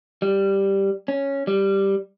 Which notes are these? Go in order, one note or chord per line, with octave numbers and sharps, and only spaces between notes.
G3
C#4
G3